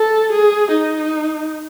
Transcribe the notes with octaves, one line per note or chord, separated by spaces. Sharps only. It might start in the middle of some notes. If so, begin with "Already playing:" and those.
Already playing: A4
G#4
D#4